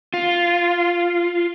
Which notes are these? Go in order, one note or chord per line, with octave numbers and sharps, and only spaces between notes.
F4